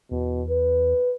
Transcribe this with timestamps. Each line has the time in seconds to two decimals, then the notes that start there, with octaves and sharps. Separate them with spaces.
0.11 E2 B2
0.49 B4